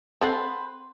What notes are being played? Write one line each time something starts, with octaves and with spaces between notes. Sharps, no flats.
C4 A4 B4 C5 F#5 C6